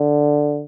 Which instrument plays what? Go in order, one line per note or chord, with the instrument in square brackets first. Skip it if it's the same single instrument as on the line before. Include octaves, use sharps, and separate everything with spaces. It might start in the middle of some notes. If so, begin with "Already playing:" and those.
Already playing: [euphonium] D3